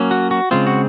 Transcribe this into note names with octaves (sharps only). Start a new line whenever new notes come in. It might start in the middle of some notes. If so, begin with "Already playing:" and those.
Already playing: F#3 A#3 C#4
F#4
F#4
C#3 G#3 C4 F4
F#4